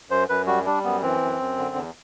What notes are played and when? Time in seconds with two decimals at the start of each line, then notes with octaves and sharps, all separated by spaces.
0.10 F#2 C5
0.29 F#2 B4
0.47 G3 F#4
0.65 G3 D4
0.84 F#2 B3
1.02 E3 C4
1.21 F#2
1.39 F#2
1.58 D3
1.75 E2